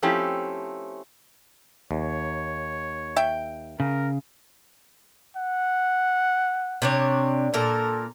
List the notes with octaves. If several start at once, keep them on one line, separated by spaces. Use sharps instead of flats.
F3 A3 C4 C#4 E4 G4
D#2 C#5
E5 G5
C#3 A#4
F#5
C3 D4 C#5
A#2 A4 A#4